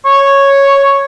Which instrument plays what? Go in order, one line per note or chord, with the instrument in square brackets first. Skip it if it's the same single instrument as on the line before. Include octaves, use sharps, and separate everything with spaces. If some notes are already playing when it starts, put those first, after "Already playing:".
[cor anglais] C#5